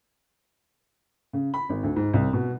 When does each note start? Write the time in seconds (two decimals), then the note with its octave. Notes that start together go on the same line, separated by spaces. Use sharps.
1.33 C#3
1.54 B5
1.69 G#1
1.84 D2
1.96 G#2
2.14 C2
2.33 B2